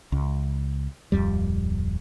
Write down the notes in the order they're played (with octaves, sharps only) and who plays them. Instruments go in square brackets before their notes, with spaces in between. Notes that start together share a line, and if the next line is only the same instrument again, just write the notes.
[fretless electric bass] C#2
D1 F2 G3